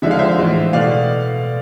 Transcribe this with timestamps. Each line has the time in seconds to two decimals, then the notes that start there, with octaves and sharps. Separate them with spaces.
0.02 D3 F3 G#3 E5
0.11 F5
0.19 C5 E5
0.39 A2 E3 G#3
0.73 B2 A3 D5 F5